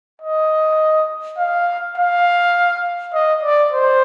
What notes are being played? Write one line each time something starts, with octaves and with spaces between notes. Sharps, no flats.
D#5
F5
F5
D#5
D5
C5